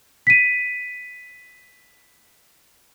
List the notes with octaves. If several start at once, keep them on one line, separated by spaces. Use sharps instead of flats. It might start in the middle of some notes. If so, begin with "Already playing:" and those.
B6 D#7